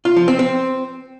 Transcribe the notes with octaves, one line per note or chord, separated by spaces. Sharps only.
F4
F3
C4
C4